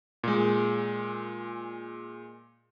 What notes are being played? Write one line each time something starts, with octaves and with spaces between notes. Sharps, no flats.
A#2 G#3